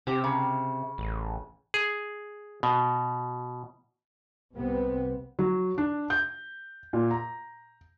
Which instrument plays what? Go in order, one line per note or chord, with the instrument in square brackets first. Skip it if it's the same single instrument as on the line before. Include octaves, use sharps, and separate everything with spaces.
[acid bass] C3 [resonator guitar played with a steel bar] C4 G4
[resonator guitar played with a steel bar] C#3
[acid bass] A1
[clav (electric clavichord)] G#4
B2
[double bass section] C2 C3 B3 C4
[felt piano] F#3
D4
G6
A#2
A#5